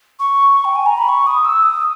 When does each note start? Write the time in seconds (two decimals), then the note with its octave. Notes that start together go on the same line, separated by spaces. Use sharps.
0.20 C#6
0.65 G5
0.76 G#5
0.86 A#5
0.98 B5
1.09 C#6
1.27 D#6
1.45 E6
1.63 D#6